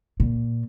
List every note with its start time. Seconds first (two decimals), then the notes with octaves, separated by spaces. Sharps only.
0.20 A#2